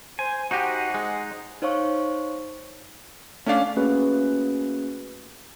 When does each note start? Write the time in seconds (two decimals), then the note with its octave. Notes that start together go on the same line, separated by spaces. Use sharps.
0.19 C5 G#5
0.51 D#4 F#4 G4 C5 F#5 G#5
0.94 G#3
1.62 D#4 C5 C#5 F5 C#6
3.46 A3 C#4 D4 F5
3.76 A3 A#3 C#4 F#4 G#4 B4